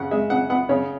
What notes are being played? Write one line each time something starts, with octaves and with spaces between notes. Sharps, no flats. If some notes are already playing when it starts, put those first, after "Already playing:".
Already playing: C#3 F#5
G#3 E5
C#3 F#5
B3 F#5
C#3 C#5